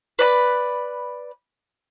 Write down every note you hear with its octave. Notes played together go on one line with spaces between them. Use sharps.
B4 D5 B5